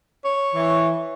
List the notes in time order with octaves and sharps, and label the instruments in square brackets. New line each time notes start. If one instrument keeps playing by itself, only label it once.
[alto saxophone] C#5
[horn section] E3